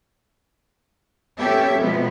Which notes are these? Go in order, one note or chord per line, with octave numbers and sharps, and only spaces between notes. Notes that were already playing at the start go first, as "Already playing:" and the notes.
A#2 B3 C#4 G4 A4 E5
B2 F3 F#3 G#3 B3